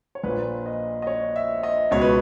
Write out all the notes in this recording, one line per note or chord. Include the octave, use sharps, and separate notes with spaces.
C#5
A#1 A#2 B4
D#5
D#5
C#5
E5
D#5
C#2 B2 C#5
B4